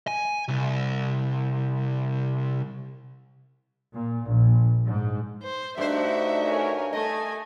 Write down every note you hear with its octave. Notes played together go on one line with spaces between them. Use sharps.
G#5
C2
A#2
A#1
G#2
C5
G2 A3 D#4 F#4 C5 E5
A#4 C#5 G#5
A3 D#5 G#5